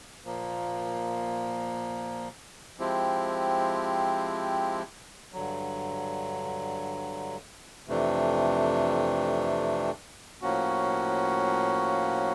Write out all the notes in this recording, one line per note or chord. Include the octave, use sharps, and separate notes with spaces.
A#2 F3 A#3
F3 G#3 C4 E4 G4
G2 D3 F#3
F2 C3 E3 A3 D4
A2 F3 A#3 C#4 F#4